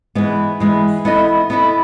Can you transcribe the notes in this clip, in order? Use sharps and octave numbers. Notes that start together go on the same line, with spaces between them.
E3 G#3 B3
E3 G#3 B3
B3 E4 A4 D#5
B3 E4 A4 D#5